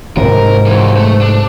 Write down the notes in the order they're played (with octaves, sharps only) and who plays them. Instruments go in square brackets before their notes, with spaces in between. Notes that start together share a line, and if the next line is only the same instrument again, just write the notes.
[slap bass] G#2 C3 [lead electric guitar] A#4
[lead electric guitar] E3 F#3
A3
D4